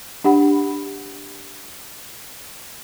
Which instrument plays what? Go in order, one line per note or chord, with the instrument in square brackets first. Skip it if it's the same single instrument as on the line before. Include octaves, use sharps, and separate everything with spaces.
[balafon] D4 G4 F#5 B5